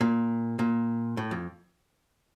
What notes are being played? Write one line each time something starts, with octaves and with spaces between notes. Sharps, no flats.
A#2
A#2
A2
F2